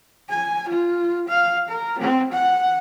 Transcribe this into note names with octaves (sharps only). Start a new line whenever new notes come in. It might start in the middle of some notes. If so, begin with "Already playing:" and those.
G#5
F4
F5
A#4
C4
F#5